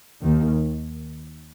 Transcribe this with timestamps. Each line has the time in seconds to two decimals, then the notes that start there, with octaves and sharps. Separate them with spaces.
0.24 D#2 D#3